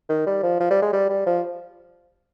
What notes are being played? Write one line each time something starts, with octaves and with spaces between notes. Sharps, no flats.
D#3
G3
F3
F3
G3
G#3
G3
G3
F3